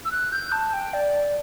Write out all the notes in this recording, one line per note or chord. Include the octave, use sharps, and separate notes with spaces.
E6
F#6
G6
A5
G5
D5